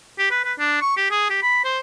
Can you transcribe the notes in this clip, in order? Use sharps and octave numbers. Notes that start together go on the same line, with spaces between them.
G4
B4
B4
D4
C#6
G4
G#4
G4
B5
C5